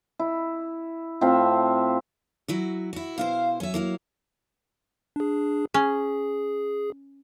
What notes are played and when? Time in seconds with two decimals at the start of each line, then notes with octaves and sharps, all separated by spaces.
0.19 E4
1.21 A2 C4 F4 E5
2.48 F#3 E4 F#4
2.93 E4 F#4
3.18 B2 E4 C5 F5
3.60 F#3 C#4 E5
3.74 A#3 E4 F5
5.16 D4 G#4
5.74 C#4 G#4